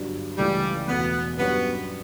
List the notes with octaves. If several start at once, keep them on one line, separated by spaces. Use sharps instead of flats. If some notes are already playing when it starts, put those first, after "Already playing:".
Already playing: G1 G2 F#3
C#2 C#3 E3 G3 A3
E2 B2 A3 B3
G2 F#3 B3 C#4 G4